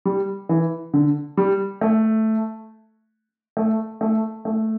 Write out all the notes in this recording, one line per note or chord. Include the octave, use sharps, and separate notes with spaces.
G3
E3
D3
G3
A3
A3
A3
A3